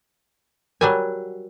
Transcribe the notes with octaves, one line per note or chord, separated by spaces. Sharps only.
F#3 G3 A#4 F#5 G#5